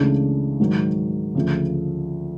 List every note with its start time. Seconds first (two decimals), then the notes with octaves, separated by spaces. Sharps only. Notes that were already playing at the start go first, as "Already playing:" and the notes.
Already playing: C#2 C#3 E3 A3 D4
0.60 G#2 D#3 F#3
1.35 D2 C#3 F3 A3